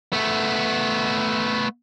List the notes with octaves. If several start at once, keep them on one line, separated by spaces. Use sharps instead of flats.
A3 B3